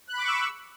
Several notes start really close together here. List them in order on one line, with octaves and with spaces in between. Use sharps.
F#6 B5 D6 C#6 E6